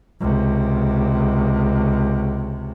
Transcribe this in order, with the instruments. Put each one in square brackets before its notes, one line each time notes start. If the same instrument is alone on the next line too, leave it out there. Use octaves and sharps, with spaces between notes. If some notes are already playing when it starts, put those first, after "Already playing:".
[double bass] C#2 C3